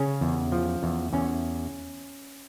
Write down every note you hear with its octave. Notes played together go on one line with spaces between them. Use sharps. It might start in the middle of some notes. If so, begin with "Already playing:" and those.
Already playing: C#3 C#4
E2
F3
E2
E2 C#4